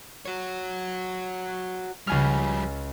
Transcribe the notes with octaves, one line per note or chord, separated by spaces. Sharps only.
F#4 C#5
C#2 F3 G3 G#5 F6